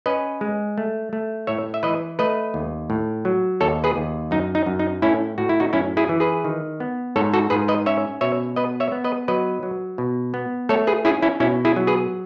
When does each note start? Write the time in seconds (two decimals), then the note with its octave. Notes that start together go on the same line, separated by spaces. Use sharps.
0.06 C#4 B4 D#5
0.41 G#3
0.78 A3
1.13 A3
1.47 A2 C#5 E5
1.74 E5
1.83 E3 B4 D#5
2.19 A3 B4 D#5
2.54 D#2
2.90 A2
3.25 F#3
3.61 D#2 A4 C#5
3.84 G#4 B4
3.96 D#2
4.31 F#2 D#4
4.55 D#4
4.66 F#2
4.79 D#4
5.02 A2 C#4 E4
5.38 A2 F#4
5.49 E4
5.60 D#4 F#4
5.73 F#2 C#4 E4
5.97 E4 G#4
6.09 E3
6.20 G#4 B4
6.45 D#3
6.80 B3
7.16 G#2 A4 C#5
7.34 F#4 A4
7.50 G#2 G#4 B4
7.68 B4 D#5
7.86 C#4 C#5 E5
8.21 B2 C#5 E5
8.56 B3 B4 D#5
8.80 C#5 E5
8.92 B3
9.04 B4 D#5
9.28 F#3 B4 D#5
9.63 F#3
9.98 B2
10.34 B3
10.69 A3 A4 C#5
10.87 G#4 B4
11.05 C#4 E4 G#4
11.22 C#4 E4
11.40 B2 C#4 E4
11.65 E4 G#4
11.76 F#3
11.87 G#4 B4